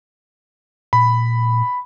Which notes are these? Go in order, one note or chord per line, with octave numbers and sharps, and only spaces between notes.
A#2 B5